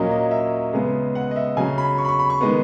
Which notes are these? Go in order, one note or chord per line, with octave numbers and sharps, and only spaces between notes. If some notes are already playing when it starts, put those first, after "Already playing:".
Already playing: A#2 F#3 A#3 C#4 D#5
D#5
E5
C#3 G#3 B3
F#5
D#5
E5
C#3 F#3 C#4 G#5
B5
C#6
B5
C#6
B5
C#6
D#3 G#3 B3